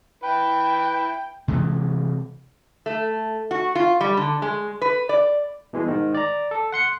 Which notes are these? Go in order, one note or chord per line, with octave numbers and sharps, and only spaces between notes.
E4 B4 G5
C3 E3 G#3
A3
F#4
F4
G3
D3
G#3
B4
D5
B2 E3 G#3
G#2 D#3
D5 A#5
A4
F#5 C6 C#7